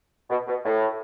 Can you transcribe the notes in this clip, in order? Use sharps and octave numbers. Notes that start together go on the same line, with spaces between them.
B2
B2
A2